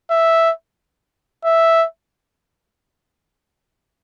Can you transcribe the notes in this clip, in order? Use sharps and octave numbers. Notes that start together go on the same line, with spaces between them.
E5
E5